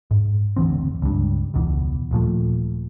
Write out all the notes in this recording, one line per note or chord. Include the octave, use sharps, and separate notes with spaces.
G#2
F#1 D2 E3 C4
C#2 G2
E1 C#2 B2 E3
D#1 A#2 F3 A3